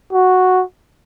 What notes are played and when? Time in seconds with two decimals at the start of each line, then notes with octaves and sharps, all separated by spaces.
0.13 F#4